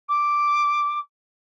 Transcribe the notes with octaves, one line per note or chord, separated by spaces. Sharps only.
D6